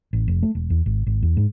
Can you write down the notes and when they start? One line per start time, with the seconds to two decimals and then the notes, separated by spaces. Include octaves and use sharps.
0.13 A1
0.28 F1
0.43 A3
0.55 E1
0.70 E2
0.86 G#1
1.06 G#1
1.22 E2
1.37 G#2